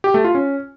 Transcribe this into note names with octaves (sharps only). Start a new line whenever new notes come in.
G4
A3
F4
C#4